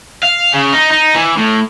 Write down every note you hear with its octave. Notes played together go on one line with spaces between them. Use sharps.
F5
C#3
D#4
D#4
E3
A2